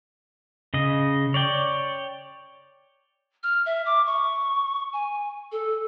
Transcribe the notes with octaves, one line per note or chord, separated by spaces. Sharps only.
C#3 D#5
C#5 D5 G5
F6
E5
D6
C#6
G#5
A4